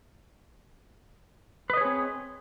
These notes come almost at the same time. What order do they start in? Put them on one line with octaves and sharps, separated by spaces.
B4 D#5 C#5 G#4 C4